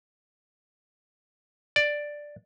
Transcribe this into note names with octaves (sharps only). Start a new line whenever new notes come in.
D5